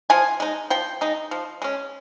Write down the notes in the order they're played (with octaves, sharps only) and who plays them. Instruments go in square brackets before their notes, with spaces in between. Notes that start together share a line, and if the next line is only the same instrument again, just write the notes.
[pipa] F3 G#5
G#3 D#4
F3 G5
G#3 D#4
F3
G#3 C#4